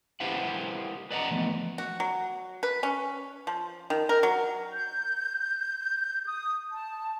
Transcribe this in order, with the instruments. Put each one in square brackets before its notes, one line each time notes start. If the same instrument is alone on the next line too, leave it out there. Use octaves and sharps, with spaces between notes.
[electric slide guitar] E4 G4 B4 C5 F5 F#5
B4 D5 D#5 F#5 A#5
E3 F3 A3 B3
[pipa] F#4
F#3
B4
C#4
F3
D#3
A#4
F#3
[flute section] G6
D#6
A5